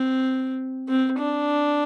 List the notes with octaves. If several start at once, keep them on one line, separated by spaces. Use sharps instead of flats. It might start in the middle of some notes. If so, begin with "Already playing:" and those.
Already playing: C4
C4
D4